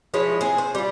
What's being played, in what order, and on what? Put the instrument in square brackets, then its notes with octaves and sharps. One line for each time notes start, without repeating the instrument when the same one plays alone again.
[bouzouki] F3 G#3 E4 C#5
C4 G#4
C5
G3 F4